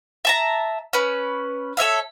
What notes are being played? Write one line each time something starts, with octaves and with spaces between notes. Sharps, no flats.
E5 A5 A#5
C#4 B4
A4 C#5 E5 F5